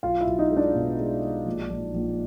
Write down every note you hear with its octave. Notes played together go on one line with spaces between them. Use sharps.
B1 F4 F5
E4 E5
B1
D#4 D#5
G#3
D4 D5
B2
G#3
G#3
A#1
A#1
A#1